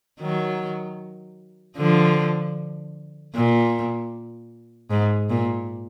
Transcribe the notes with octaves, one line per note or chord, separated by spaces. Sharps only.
D#3 F#3
D3 F3
A#2
G#2
A#2